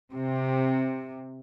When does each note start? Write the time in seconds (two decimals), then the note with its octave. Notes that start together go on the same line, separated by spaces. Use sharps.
0.11 C3